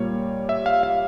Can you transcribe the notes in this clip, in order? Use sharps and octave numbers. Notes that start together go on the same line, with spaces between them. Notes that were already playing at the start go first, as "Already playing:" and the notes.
Already playing: A#2 G3 A#3 C#5
E5
F5
F5